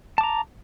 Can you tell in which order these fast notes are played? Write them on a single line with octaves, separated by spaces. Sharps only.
A5 D6 A#5